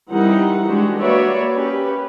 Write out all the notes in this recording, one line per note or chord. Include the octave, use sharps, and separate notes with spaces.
E3 G3 C4 D#4 A#4 F#5
G#3 D4 F#4 G4
A#3 F#4 B4 C#5 D5 E5
C#4 G4 B4